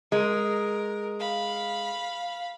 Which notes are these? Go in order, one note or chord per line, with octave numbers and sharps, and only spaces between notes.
G#3 A#4
F5 B5